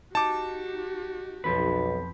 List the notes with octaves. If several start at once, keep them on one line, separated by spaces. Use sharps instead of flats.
D#4 F#4 G4 A5 D6
B1 F2 F3 B4